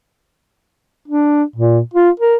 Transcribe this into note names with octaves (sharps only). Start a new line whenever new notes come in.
D4
A#2
F4
A#4